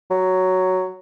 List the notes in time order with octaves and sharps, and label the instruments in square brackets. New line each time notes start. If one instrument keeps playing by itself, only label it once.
[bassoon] F#3